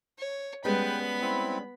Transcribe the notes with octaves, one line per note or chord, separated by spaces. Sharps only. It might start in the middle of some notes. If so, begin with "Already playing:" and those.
C#5
G3 G#3 B3 C#4 B4 G5 B5
C4 E4